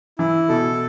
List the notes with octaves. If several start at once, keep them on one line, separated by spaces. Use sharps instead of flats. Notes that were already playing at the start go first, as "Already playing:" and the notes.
E3 E4
B2 A4